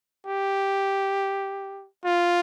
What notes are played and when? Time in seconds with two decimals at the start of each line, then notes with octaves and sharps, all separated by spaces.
0.27 G4
2.05 F4